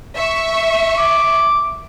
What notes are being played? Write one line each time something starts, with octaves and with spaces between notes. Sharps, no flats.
E5 C#6
D6